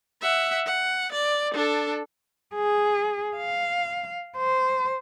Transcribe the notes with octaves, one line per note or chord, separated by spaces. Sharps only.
E5 F#5
F#5
D5
D4 A4
G#4
F5
C5